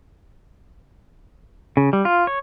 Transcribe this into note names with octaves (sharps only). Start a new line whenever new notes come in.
C#3
G3
F4
C#5